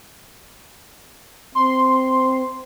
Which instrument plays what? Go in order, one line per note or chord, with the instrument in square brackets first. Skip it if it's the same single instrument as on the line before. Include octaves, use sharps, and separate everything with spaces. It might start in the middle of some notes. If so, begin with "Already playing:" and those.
[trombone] C4 [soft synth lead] C6